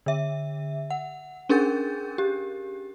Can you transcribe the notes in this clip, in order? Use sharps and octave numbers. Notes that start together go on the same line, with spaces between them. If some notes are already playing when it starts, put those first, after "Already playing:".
D3 E5
F#5
C#4 D4 G#4 A#4 G6 A6
G4